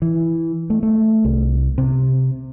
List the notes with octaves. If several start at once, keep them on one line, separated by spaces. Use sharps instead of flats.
E3
A3
A3
C2
C3